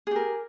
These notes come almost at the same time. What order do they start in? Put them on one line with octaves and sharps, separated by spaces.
G#4 G4 A#4